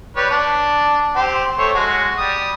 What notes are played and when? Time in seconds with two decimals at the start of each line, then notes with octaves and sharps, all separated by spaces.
0.17 G3 B4 C#5
0.30 D4
1.16 C4 G4 C5
1.58 A3 C5 C#5
1.75 G#3 F#4
2.18 G3 D#6